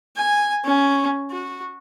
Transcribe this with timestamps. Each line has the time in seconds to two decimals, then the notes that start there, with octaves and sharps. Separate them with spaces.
0.17 G#5
0.65 C#4
1.31 F#4